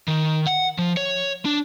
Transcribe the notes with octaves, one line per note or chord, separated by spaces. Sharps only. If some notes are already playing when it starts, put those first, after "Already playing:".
D#3
F#5
F3
C#5
D4